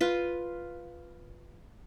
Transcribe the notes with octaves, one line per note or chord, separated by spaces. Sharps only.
F4 B4